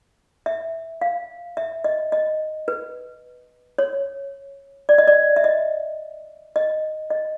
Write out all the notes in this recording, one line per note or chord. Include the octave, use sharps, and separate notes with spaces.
E5
F5
E5
D#5
D#5
B4
C#5
D5
D#5
D5
E5
D#5
D#5
D#5